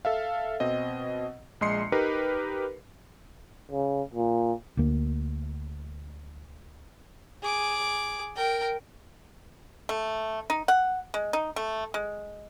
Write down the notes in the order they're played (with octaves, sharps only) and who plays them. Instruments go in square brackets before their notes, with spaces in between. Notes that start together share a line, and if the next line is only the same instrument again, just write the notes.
[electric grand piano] A4 E5 F5
B2 C4 D#5
A#1 G#3 D#5 C6 C7 C#7
D#4 G4 A#4 B4
[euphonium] C#3
A#2
[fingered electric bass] D2 D3 A#3
[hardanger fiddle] G#4 D6
A#4 G5
[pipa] A3
D#4
F#5
G#3
D#4
A3
G#3